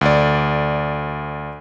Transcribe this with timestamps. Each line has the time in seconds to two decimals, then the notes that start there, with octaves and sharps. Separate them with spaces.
0.01 D2 D5